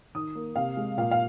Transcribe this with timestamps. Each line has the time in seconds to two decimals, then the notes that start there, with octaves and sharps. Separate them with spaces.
0.15 D#3 D#6
0.35 A#3
0.56 C3 F5
0.77 G#3
0.97 A#2 F5
1.11 F5